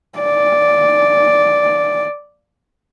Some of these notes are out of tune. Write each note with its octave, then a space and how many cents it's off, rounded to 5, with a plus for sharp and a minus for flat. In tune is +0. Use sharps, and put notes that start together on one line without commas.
D5 -5